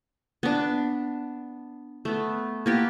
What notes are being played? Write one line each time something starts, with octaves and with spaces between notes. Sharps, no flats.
B3 D4
A3 B3
A#3 B3 G4